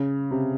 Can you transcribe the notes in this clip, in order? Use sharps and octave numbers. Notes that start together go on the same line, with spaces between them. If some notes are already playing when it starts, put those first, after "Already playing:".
Already playing: C#3
C3